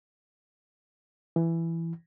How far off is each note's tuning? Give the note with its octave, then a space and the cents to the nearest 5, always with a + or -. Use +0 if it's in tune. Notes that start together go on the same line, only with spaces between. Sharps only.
E3 +10